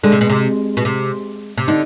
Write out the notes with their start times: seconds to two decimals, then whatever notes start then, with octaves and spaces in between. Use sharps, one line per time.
0.03 D3 G#3
0.12 C3
0.21 B2
0.30 C3
0.77 B2
0.85 C3
1.58 C3
1.68 D3 D#4